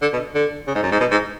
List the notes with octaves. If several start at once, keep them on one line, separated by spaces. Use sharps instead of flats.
D3
B2
D3
C#3
G#2
F#2
G#2
B2
G#2